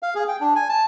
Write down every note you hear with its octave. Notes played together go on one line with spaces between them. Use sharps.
F5
G#4
G5
D4
G#5
A5